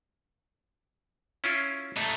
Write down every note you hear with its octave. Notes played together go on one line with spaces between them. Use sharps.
C#4 E4 F4
A3 D#4